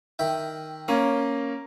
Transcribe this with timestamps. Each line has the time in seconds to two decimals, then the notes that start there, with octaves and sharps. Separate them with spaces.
0.19 D#3 E5 G5
0.88 A#3 C#4 D#6